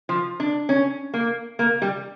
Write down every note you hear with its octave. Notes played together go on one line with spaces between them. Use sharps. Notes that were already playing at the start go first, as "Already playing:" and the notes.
F3
D4
C#4
A#3
A#3
G3